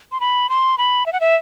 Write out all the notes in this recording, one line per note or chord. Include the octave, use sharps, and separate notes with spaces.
C6
B5
C6
B5
E5
F#5
E5